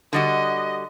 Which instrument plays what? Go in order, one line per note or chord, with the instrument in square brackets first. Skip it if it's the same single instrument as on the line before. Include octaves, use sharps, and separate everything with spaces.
[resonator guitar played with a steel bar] D3 G3 F#4 [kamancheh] D#5